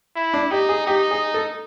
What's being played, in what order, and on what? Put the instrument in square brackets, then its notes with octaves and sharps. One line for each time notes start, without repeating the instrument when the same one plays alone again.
[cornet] E4
[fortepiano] D4
[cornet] D#4 [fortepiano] G4
[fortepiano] G#4
[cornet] D#4 [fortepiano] G4
[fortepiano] G#4
A4